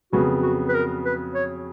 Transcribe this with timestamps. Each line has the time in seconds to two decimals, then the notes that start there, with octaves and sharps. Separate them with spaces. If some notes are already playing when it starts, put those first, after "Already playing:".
0.13 F2 C#3 F#3 B3 F#4
0.43 F#4
0.69 B4
0.75 A#4
1.05 B4
1.35 C#5